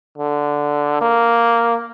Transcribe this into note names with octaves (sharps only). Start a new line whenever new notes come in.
D3
A#3